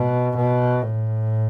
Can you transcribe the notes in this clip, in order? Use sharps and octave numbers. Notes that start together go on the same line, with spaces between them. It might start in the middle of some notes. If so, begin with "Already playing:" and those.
Already playing: B2
B2
A2